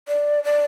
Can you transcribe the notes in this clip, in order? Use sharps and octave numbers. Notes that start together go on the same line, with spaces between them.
D5
D5